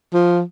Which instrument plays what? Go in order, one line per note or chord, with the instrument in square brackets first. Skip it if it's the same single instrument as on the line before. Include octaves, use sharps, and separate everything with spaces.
[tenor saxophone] F3